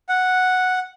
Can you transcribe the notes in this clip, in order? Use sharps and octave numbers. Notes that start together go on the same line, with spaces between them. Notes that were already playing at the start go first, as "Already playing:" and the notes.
F#5